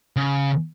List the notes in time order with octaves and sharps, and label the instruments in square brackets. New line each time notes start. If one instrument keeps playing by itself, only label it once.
[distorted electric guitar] C#3